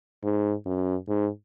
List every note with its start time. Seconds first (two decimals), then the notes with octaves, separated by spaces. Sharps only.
0.24 G#2
0.66 F#2
1.08 G#2